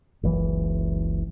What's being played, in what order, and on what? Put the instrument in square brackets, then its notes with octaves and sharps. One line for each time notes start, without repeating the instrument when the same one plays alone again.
[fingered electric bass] F#1 C#2 E3